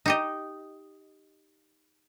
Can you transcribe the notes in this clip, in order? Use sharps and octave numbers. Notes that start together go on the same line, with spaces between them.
D#4 G4 D#5